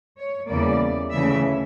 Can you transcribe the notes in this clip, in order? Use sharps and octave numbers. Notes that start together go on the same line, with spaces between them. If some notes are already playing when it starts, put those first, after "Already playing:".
C#5
E2 C#3 E3 G3 A#3 D5
D2 C#3 E3 A3 E5